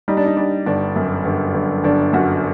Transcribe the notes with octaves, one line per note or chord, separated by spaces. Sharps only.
G3 D#4
D4
D#4
G3 D4
G1 D4
F#2
G1
G1
G1 D4
F#2 F#4